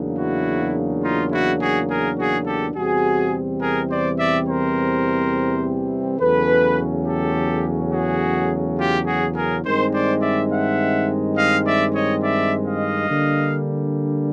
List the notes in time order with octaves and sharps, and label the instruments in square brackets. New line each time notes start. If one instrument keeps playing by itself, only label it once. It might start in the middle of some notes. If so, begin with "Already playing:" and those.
Already playing: [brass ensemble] E2 C#3 F#3 A#3 D4
E4 F#4
D#4 F4
E4 F#4
F#4 G#4
G#4 A#4
F#4 G#4
G4 A4
E2 C3 E3 G3 C4 F#4 G#4
G#4 A#4
C5 D5
D5 E5
A#4 C5
E2 C#3 F#3 A3 C#4 A4 B4
G4 A4
F#4 G#4
F4 G4
F#4 G#4
G#4 A#4
G2 D#3 G#3 C4 D#4 A#4 C5
C5 D5
D5 E5
E5 F#5
D#5 F5
D5 E5
C#5 D#5
D5 E5
D#5 F5
D3 G3 A#3 D4